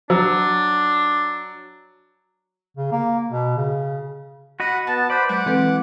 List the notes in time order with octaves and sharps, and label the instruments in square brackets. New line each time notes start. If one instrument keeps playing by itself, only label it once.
[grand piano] F#3 [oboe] D4
[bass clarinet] C#3
A#3
B2
C#3
[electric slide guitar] F#4 D#5 [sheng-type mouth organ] F#5 B5
[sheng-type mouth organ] B3 A5 [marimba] A6
[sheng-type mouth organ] B4 C5 B5 [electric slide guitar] D5
[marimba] F#3 G#3 G6 [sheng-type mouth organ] F#5 D6
[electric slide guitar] E3 [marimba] C4 A4 B4